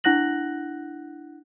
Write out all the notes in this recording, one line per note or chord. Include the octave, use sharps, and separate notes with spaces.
D4 E4 F#5 F#6 A#6 F#7